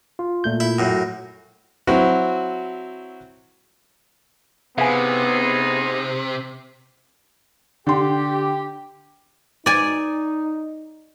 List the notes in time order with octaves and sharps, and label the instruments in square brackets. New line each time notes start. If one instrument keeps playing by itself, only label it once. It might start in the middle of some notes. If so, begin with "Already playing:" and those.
[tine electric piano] F4
A#2 A3 G6
[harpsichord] E4
F#2 A2
[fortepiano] F#3 C4 E4 F#4
[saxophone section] A2 D#4 G#4 [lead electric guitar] C3 [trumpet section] B3 [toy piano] F5 G#5
[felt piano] D3 C6 [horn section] G4
[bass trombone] D#4 [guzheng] D5 G#5